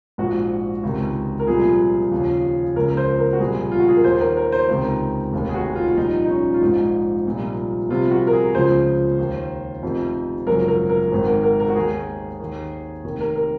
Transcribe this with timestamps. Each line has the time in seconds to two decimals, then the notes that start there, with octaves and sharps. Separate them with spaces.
0.18 A#1 G#2 F3 F#4
0.83 C#2 C3 D#3
1.39 A#4
1.47 C2 A#2 F3 G#4
2.11 D#2 C#3 F3
2.76 C#2 C#3 F3 A#4
2.90 A#4
2.97 C5
3.19 A#4
3.33 F#4
3.40 C2 A#2 F3 G#4
3.71 F4
3.79 F#4
3.88 G#4
3.96 A#4
4.04 D#2 D#3 C5
4.20 A#4
4.37 A#4
4.52 C5
4.69 C#2 C3 D#3 A#4
5.33 F1 D#2 D#3
5.49 G#4
5.54 F#4
5.76 F4
5.97 C2 A#2 F3 D#4
6.25 D#4
6.29 C#4
6.54 F4
6.61 A#1 G#2 F3 D#4
7.26 C2 A#2 F3
7.89 C2 C3 F3 F4
8.11 F#4
8.27 A#4
8.32 G#4
8.54 C#2 C#3 F3 C5
9.18 D#2 D#3
9.83 F1 F2 C3 D#3
10.47 G#1 F#2 C#3 F3 A#4
10.68 A#4
10.90 A#4
11.11 G#1 G#2 D#3
11.27 A#4
11.43 A#4
11.60 A#4
11.69 F#4
11.75 D#2 D#3 G#4
12.40 D#2 D#3
13.04 F1 D#2 D#3
13.20 A#4
13.36 A#4